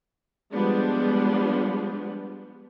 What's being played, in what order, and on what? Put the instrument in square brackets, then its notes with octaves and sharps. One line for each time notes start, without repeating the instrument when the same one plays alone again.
[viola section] F3 G3 G#3 B3 D4